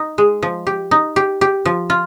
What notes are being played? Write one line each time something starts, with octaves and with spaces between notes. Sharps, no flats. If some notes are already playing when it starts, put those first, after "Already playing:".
Already playing: D#4
G#3
F3
G4
D#4
G4
G4
F3
F4